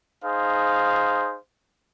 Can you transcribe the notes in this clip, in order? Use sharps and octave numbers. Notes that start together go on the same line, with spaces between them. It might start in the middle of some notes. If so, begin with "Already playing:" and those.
D#4 G#4 C5 F5